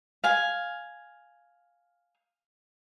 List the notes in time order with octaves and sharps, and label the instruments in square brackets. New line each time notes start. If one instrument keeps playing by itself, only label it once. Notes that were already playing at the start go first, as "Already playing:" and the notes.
[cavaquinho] F5 G#5